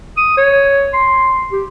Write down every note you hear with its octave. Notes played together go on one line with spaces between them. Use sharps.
D#6
C#5
C6
G4